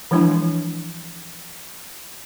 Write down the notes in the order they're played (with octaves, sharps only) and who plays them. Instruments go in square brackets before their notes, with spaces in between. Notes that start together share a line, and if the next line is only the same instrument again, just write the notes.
[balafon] E3 F3 G#3 D4 E4